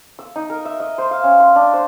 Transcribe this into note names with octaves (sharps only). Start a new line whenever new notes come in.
E6
D#4
A#4
E5
D#5
C5
F5
C#4
C6
D4
C5